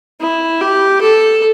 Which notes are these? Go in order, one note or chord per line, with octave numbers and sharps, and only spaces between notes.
E4
G4
A4